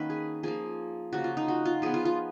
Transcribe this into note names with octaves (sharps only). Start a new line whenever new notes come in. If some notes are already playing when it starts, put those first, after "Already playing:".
Already playing: D#3 A#3 C#4 D#4 F#4 B4
G#4
F3 A#3 G#4
C#3 F3 A#3 F#4
F4
D#4
F#4
F4
F3 B3 G#4
F4
F4